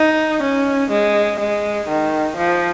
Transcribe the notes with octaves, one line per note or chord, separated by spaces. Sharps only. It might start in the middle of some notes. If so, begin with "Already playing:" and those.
Already playing: D#4
C#4
G#3
G#3
D#3
F3